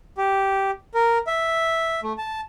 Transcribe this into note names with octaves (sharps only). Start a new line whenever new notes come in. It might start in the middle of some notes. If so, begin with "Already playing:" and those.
G4
A#4
E5
A3
A5